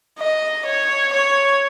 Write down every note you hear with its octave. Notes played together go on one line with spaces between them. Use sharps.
D#5
C#5
C#5